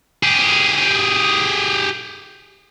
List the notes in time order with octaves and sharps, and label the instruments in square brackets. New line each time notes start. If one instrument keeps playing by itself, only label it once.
[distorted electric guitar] G4 G#4